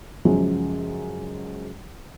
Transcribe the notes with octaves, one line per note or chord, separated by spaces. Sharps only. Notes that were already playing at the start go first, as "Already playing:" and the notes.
F#2 C#3 F3 F#3 G#3